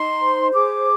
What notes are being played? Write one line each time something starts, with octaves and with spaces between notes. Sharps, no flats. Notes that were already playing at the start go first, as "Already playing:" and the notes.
Already playing: D#4 C6
C5
G#4 D6